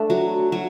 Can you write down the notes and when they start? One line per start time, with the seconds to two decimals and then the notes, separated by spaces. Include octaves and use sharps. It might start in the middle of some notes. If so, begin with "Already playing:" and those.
Already playing: A3 D4
0.10 F#3
0.52 F#3